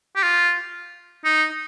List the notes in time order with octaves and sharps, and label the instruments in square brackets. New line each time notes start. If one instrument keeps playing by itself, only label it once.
[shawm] G4
F4
D#4